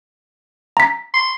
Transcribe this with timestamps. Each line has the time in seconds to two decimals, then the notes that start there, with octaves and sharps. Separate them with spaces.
0.77 A#5 B6
1.14 C6